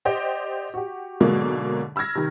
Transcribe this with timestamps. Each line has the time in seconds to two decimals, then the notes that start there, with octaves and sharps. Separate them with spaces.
0.05 G4 C5 D5 D#5 F#5 G5
0.74 F#4 G4
1.20 G#2 B2 D3 F#3 G#3 A#3
1.96 B5 E6 F6 G#6 A#6
2.15 C3 D#3